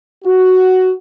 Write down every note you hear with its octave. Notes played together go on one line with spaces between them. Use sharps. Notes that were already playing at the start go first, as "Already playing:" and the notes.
F#4